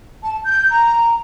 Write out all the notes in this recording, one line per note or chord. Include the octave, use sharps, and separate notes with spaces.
A5
G6
A#5